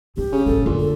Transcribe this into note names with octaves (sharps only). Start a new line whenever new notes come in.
F3 C4 G4
C#3
A1 A#3 A4
F2 A#2 D3
A4